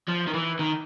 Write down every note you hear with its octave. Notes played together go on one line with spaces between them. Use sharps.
F3
D#3
E3
D#3